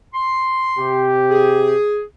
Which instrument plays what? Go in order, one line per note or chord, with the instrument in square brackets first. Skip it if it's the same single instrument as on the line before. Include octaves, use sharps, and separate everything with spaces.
[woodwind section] C6
[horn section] C3 G4
[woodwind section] G#4